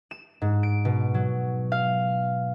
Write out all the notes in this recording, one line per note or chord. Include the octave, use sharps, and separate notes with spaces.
E7
G#2
D7
B2
F#3
F5